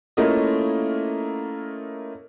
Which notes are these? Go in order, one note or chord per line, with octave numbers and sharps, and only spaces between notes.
A3 A#3 C#4 E4 F4 D#5